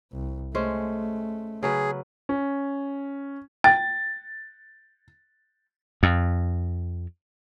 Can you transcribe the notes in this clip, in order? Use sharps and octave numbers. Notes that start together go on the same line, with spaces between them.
C2
G#3 A3 C#4 C5
C#3 F#3 G#4 B4
C#4
G5 A6
F2